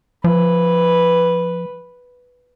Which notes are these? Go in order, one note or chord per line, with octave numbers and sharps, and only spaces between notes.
F3 B4